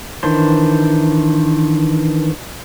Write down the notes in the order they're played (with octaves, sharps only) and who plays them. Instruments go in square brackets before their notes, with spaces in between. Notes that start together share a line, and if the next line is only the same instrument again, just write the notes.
[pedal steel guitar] D#3 E3 D4 C5